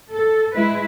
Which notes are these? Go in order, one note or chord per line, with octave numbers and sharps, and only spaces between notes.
A4
G#3 E4 B4